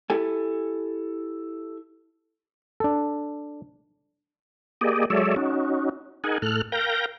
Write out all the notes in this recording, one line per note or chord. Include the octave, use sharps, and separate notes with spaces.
E4 G4 A4 G#5
D4 A4
A#3 G4 G#4 D5 D#5
F#3 G#3 A4 C#5 D5 E5
C#4 D#4 F#4
D#4 G#4 A#4 F#5 G#5
A2 A4 F6 F#6
A#4 F5 G5 G6 A#6